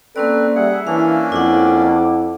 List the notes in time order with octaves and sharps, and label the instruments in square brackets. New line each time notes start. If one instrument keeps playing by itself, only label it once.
[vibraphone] A#3 C#4 D5 [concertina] C4 B4 [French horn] A4
[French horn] G3 [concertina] G#4 F#5 [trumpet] E5
[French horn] E3 [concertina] A#3 C#4 D4 [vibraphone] F5
[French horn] F2 [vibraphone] E4 F#5 [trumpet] D6